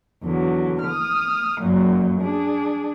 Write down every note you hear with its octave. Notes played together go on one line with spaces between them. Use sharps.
E2 D3 F#3
D#6 F6
F#2 A#2 F#3
D4 G#4